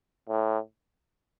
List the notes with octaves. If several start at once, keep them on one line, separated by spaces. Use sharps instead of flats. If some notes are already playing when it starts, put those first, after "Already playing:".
A2